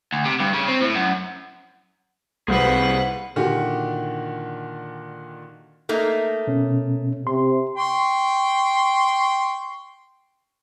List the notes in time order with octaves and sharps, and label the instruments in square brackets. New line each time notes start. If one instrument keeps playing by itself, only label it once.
[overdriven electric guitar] D2
C3
G2
C#3
C4
A2
F#2
[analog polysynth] C2 [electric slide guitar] G#4 C5 F5 [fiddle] B4 F#5
[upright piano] A#2 D3 D#3 F#4 G4
[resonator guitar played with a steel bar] A3 A#3 D#4
[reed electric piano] B2 C#4
[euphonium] C3 [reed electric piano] C6
[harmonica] G5 C6 C#6